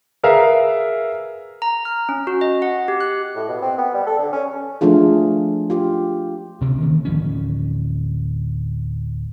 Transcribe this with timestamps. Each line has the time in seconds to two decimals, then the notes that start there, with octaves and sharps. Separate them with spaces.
0.23 G#4 A#4 B4 E5 F5
1.62 A#5
1.85 F6
2.09 C#4
2.27 F#4
2.41 D#5
2.62 F#5
2.88 G4
3.01 F#6
3.35 A2
3.48 B2
3.62 C4
3.78 B3
3.94 G3
4.06 A4
4.19 D3
4.32 C#4
4.81 F3 A3 D4 F4 G#4
5.70 F4 G4
6.61 D2 C3 C#4
6.81 D#3 E3 A#3
7.05 D1 F3 C#4